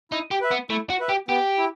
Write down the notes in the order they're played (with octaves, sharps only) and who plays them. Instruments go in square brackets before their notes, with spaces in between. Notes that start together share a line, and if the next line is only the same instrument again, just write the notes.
[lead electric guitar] D#4 [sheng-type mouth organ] E4
[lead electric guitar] G4
[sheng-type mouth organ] B4 E5
[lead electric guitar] B3
[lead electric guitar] A3 [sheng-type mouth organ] E4
[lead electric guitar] F#4
[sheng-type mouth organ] B4 E5
[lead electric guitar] G4
[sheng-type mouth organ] B3 [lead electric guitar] G4
[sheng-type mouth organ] E4